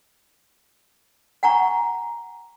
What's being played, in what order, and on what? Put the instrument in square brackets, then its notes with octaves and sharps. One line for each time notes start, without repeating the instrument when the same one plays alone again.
[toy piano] F#5 G#5 A#5 C#6